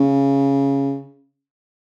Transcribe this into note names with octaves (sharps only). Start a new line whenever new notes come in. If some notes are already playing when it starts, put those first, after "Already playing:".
Already playing: C#3